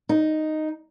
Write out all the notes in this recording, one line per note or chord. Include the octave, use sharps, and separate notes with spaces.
D#4